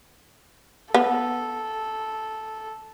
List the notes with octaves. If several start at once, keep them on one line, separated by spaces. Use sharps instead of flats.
B3 A4